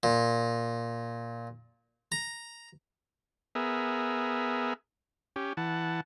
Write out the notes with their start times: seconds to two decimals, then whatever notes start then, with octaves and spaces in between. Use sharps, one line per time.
0.03 A#2
2.12 A#5
3.55 B3 G#4 A#4 E5
5.36 C#4 G4
5.57 E3 F#5 A5